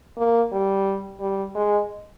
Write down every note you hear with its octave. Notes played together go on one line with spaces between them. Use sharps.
A#3
G3
G3
G#3